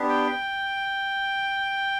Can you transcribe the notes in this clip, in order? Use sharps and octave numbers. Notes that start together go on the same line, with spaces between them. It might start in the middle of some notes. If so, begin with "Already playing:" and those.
Already playing: B3 D4 G4
G5